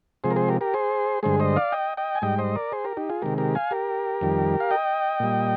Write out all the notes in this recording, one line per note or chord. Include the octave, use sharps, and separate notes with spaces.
C3 F3 G#3 G#4 C5
A#4
G#4 C5
G4 A#4
G4 A#4
G#4 C5
G2 D3 G#3 G#4 C5
C5 D#5
D5 F5
D#5 G5
D#5 G5
G#5
G#2 G3 D#5 G5
C5 D#5
A#4 D5
G#4 C5
G4 A#4
D#4 G4
F4 G#4
C3 D#3 G#3 G4 A#4
G4 A#4
F5 G#5
G4 A#4
F2 D#3 G3
F5
D#5 G5
A#2 G3